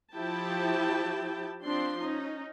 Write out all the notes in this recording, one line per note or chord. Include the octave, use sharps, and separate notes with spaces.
F3 E4 G4 G5 A5
F3 C4 D4 C6
C#4 D#4